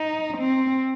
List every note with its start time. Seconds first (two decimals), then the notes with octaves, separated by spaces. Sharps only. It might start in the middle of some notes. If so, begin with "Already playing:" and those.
Already playing: D#4
0.38 C4